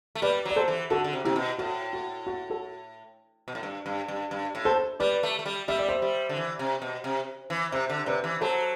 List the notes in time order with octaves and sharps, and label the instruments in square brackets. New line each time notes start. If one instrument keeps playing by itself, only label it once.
[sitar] A3
[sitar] G3 [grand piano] B4 D5
[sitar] F#3
[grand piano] D5
A4 C5
[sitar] E3
[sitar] D3 [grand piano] F#4 A4
[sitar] D3
C3
[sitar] C3 [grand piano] E4 G4
[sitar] B2
[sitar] A2 [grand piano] F#4
[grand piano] F#4
F#4
F#4 A4
[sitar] B2
A2
G2
G2
G2
G2
A2
[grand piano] A4 C5
[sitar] G3 [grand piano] B4 D5
[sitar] A3
A3
G3
[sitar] G3 [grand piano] E5
[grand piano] D5
C5 E5
[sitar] G3
D3
E3
C3
B2
C3
E3
[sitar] C3 [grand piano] C5 E5
[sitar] D3
[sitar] C3 [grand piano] B4 D5
[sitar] E3
[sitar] F#3 [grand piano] A4 C5